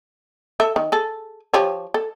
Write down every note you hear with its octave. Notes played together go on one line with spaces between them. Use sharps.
A4 E5
D#3
G#4 A4
F3 G4 C#5
A4